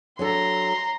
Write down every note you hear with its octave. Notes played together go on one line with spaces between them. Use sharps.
F#3 D4 A4 A#5 C6